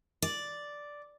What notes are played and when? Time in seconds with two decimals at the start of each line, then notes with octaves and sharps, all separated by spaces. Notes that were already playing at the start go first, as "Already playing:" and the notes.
0.22 D5